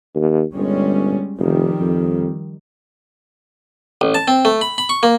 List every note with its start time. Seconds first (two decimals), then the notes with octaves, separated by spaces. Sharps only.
0.15 D#2
0.54 G1 G3 G#3 C#4
1.39 F1 D#3 F3 G3
1.80 F2
4.01 A1
4.15 A5
4.28 C4
4.45 A3
4.61 B5
4.78 B5
4.89 C#6
5.03 A#3